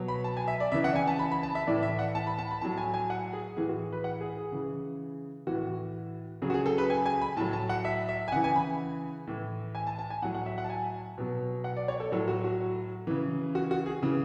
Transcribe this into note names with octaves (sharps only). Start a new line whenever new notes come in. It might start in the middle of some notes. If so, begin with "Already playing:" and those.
Already playing: B2 F#3
B5
A5
G#5
E5
D5
C#3 E3 E5
F#5
G#5
A5
B5
B5
A5
E5
A2 E3 D5
E5
F#5
A5
B5
A5
B5
A2 F#3 A5
G#5
G#5
F#5
G#4
A2 E3 G#4
F#4
B4
F#5
G#4
G#4
C#3 E3
A2 E3 F#4
C#3 F#3 G#4
F#4
G#4
A4
B4
G#5
G#5
B5
A2 F#3 A5
A5
F#5
E5
E5
G#5
C#3 E3 F#5
G#5
B5
A2 E3
G#5
A5
A5
G#5
A2 F#3 F#5
F#5
E5
F#5
A5
G#5
B2 F#3
F#5
D5
C#5
A4
A2 F#3 A4
F#4
F#4
C#3 E3
F#4
F#4
G#4
C#3 E3